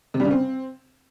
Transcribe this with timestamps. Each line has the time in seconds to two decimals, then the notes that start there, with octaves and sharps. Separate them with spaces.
0.14 C3
0.20 G3
0.25 C#3
0.31 C4